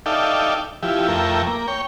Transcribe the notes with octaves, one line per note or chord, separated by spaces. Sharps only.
D#4 A4 D5 E5 F5 G5
F3 E4 G4
F2 A3 A#4 E5 G5
A#3
C#5 G5